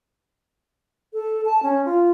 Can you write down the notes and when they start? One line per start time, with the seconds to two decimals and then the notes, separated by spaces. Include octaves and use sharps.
1.13 A4
1.45 A5
1.63 C#4
1.85 F4